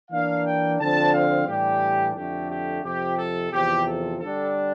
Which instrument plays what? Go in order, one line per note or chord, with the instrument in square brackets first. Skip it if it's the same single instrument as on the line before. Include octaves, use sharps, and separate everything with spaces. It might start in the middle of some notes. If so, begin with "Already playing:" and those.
[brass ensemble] E3 A#3 D4 F5
G5
D3 F3 C4 F4 A5
F5
A2 E3 G3 D4 G4
F2 D3 A3 G4
G4
F2 C3 F3 G4
A4
E2 C3 F3 G4
A4
D3 G3 D4 A4